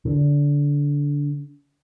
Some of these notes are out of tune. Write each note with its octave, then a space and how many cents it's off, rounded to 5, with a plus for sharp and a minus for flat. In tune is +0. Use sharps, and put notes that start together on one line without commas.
D3 -25